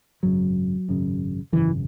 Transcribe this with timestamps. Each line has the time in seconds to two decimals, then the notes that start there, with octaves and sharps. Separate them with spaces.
0.23 G#1 F#2 C#3 F#3
0.88 G#1 F#2 C#3
1.52 G#1 F#2 C#3 E3